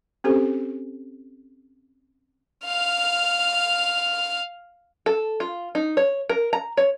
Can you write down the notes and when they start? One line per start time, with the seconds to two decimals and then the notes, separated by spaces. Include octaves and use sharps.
0.24 C4 C#4 G4 A4 C5
2.66 F5 F6
5.06 A4
5.40 F4
5.75 D#4
5.97 C#5
6.29 A#4
6.53 A#5
6.77 C#5